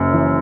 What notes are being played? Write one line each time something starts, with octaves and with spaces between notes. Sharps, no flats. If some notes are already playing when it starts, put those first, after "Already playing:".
Already playing: F#1 F#2
E3